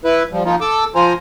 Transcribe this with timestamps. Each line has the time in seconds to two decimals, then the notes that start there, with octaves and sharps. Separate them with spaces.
0.05 E4 B4
0.32 F3 G3
0.45 F3 A#3 D#4 F4
0.61 A4 D6 E6
0.95 F3 F4 C5 G#5 A#5